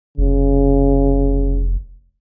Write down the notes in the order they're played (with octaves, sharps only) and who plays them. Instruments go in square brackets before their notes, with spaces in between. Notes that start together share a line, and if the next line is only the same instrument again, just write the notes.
[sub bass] F1 [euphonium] C#3